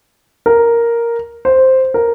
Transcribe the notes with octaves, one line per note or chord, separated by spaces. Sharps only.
A#4
C5
A#4